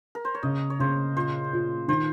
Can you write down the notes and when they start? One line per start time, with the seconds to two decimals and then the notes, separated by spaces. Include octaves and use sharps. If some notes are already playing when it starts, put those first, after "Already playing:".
0.15 A#4
0.25 C5
0.35 C#5
0.43 C#3 D#5
0.70 C#5
0.80 C#3 C5
1.16 A#2 C5
1.53 A#2
1.88 D#3 C5